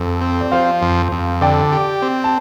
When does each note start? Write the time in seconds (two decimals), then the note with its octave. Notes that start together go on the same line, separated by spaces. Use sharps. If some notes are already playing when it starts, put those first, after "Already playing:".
Already playing: F2 A4
0.21 C4
0.41 D5
0.52 F3 C5 F5
0.82 F2
1.12 F2
1.41 D3 D5 G5
1.72 G4
2.02 C4
2.24 A5